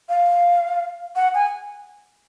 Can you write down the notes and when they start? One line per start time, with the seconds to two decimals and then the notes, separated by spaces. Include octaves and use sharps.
0.09 F5
1.16 F#5
1.34 G#5